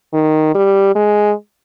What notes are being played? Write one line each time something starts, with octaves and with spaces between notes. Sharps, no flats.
D#3
G3
G#3